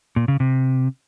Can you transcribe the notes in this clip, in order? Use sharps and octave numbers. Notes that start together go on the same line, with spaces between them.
A#2
C#3
C3